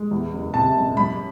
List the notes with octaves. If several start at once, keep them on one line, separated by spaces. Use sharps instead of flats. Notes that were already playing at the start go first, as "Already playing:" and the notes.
Already playing: G#3
E2
F#1
C3 A5
F#1
F#2 B5